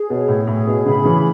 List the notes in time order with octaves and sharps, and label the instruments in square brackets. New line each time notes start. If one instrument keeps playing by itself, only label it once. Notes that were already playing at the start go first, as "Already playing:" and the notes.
Already playing: [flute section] G#4
[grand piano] B2 [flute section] C#5
[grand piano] A2
[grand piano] A2 [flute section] G#4
[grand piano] B2
[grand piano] A2 C#3 [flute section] B5
[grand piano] C#3 E3